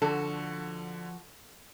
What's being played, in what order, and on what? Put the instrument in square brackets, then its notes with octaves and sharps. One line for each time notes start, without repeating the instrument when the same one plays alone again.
[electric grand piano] D3 [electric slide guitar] F3 F#4 [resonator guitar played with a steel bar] A4